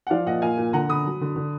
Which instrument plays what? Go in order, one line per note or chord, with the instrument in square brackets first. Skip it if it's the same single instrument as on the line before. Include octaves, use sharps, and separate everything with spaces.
[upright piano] F#5
F3 D5 F5
A#2 D#5 F#5
A#2 F5 G#5
A#2
D3 F#5 A#5
D3 B5 D#6
F#3
D3
D3